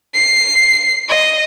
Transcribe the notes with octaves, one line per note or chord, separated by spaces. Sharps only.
C7
D#5